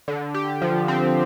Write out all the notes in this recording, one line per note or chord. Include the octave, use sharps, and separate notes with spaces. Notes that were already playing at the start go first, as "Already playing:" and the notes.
D3
G4
F3
C4